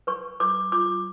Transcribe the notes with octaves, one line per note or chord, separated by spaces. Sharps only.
B4 C#6
B4 D6
F4 D6